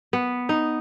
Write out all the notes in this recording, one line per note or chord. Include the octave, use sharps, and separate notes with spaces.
B3
D#4